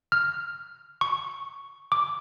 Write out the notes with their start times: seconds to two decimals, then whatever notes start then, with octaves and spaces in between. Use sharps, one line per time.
0.12 F6
1.01 C#6
1.92 D6